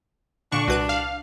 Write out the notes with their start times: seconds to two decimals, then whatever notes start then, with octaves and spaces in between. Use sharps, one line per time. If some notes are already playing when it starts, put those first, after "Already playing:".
0.52 A#2 D3 D4 C#6
0.68 C2 F#4 B4 F#6
0.89 F5